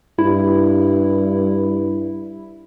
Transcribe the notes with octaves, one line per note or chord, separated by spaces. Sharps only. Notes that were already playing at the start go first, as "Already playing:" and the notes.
G2 E4